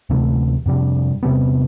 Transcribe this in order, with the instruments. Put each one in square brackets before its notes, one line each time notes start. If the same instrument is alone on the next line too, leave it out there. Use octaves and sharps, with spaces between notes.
[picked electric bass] D2 C3 E3 A3
F2 C3 G3 D4
E2 C3 G3 B3